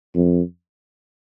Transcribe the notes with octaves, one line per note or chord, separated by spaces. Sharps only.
F2